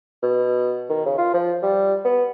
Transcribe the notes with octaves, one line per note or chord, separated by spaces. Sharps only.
B2
D#3
C#3
F4
F3
G3
B3